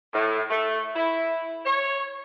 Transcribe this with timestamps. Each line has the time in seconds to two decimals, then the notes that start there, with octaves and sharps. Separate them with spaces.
0.13 A2
0.50 A3
0.95 E4
1.65 C#5